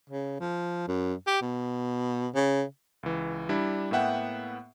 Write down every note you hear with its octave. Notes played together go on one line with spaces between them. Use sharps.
C#3
F3
F#2
G4
B2
C#3
C#2 E3
G3 D4 E4
A2 A#3 B3 E5 F#5 G5